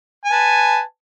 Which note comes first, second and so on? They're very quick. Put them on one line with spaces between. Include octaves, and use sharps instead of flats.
G#5 A5 B4